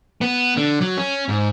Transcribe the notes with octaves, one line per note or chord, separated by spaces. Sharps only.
B3
D3
F#3
C#4
G#2